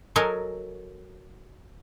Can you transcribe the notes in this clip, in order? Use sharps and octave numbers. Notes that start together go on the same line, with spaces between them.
F#3 A4 A#4 D#5 G#5